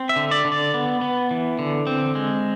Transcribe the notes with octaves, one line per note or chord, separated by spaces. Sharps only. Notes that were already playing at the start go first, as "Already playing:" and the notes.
Already playing: C4
E5
D3
D5
D3
D5
B3
B3
E3
D3
C4
G#3